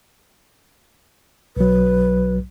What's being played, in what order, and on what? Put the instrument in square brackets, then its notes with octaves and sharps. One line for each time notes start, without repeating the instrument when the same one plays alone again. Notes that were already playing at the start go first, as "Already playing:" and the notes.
[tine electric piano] B1 F#3 [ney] B4